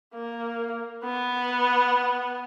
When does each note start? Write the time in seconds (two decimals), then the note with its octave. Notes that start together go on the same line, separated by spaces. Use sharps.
0.15 A#3
1.04 B3